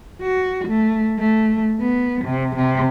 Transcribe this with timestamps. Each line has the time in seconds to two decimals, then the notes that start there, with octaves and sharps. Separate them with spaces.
0.22 F#4
0.68 A3
1.19 A3
1.81 B3
2.24 C3
2.56 C3